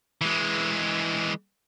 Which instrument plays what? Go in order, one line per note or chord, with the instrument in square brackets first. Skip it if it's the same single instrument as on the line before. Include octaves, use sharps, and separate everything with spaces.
[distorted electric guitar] E3 G#3